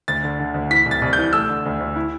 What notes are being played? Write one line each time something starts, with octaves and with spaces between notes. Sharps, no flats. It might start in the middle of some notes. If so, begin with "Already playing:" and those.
D2 A6
D3
D3
D2
E3 B6
C2
A6
C2
G6
E3
A3 E6
D3
D2
D2
E4